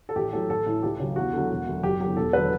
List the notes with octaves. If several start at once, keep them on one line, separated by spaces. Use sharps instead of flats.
A4
A1 G4
A2 F#3 A4
A1 A4
A2 E3
C#2 G4
C#3 F#3
E2 F#4
D3 F#3
E1
D2 D3 F#3
F#1 G4
E2 D3 F#3 G4
E1 A4
D3 F#3 B4